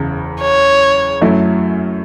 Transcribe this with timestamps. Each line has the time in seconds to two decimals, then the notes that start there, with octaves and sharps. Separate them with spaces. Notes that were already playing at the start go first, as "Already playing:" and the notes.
Already playing: F#1 E2 C#3
0.41 C#5
1.21 F#2 F#3 A3 C#4 E4